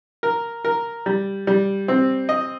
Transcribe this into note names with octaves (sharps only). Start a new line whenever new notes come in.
A#4
A#4
G3
G3
C4
D#5